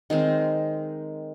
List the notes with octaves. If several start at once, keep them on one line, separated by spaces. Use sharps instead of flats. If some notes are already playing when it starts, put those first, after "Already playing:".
D#3 G#3 C4